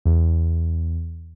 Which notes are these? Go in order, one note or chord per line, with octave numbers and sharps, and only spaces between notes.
E2